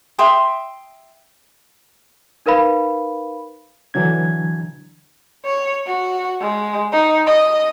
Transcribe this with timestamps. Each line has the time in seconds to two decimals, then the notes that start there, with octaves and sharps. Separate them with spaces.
0.19 E5 G5 C6 D#6
2.46 D#4 A#4 B4 F5 B5
3.94 D3 E3 F#3 D4 G#6
5.45 C#5
5.86 F#4
6.41 G#3
6.92 D#4
7.27 D#5